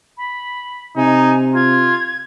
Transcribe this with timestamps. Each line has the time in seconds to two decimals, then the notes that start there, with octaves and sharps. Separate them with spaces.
0.18 B5
0.97 C3 D#4 G#5
1.55 F4 G#6